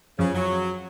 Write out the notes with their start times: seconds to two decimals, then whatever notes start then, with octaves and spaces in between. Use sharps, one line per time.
0.19 F#2 C#3 F3
0.35 F#3